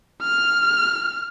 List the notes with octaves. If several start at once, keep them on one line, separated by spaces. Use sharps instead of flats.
F6